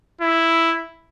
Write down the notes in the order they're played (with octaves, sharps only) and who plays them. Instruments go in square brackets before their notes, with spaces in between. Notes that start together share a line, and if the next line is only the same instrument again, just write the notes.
[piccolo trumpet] E4